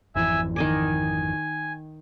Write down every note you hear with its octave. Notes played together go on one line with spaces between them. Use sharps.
G#1 F2 E3 E5 G#5
D#3 D#5 G#5 D6